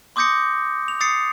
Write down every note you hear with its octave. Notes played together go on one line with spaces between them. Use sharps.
C6 D6 D#6 G6 A#6 C#7
F7
D#6 A6 C7 C#7